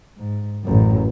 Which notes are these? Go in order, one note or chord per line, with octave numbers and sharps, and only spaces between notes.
G#2
A1 F#2